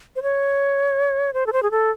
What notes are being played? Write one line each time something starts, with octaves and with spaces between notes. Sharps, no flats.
C5
C#5
C5
A4
C5
G#4
A4